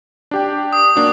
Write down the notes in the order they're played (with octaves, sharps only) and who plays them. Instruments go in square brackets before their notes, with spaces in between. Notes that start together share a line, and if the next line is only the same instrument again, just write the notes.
[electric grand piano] D4 G4 G5
[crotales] D#6
[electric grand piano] A#3 D4 F#4